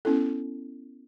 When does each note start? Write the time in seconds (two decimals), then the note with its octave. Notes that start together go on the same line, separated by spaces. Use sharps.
0.05 B3 C#4 E4 A4